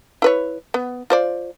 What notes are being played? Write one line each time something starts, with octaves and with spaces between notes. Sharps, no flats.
E4 B4 C#5
B3
F4 C5 D5